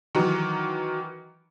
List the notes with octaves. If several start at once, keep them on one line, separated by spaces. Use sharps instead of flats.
D#3 E3 F#3